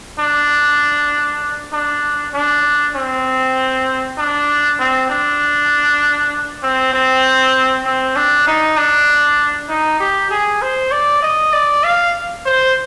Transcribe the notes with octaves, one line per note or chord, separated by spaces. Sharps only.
D4
D4
D4
C4
D4
C4
D4
C4
C4
C4
D4
D#4
D4
D#4
G4
G#4
C5
D5
D#5
D5
F5
C5